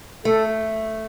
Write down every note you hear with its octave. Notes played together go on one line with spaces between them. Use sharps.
A3 A4